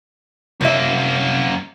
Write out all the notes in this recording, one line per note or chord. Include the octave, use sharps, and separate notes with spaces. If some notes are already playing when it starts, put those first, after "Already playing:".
C2 F#2 A#3 E5